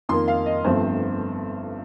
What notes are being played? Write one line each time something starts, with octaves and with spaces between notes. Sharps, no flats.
F2 D#3 A#3 C6
F5
D#5
G1 G2 F3 A3 C4 C5